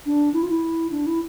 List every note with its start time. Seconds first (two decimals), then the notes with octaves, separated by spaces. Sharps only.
0.06 D4
0.34 E4
0.43 F4
0.50 E4
0.91 D4
1.07 E4